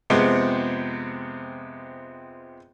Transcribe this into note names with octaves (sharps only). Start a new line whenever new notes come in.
F2 C3 G#3 B3 C4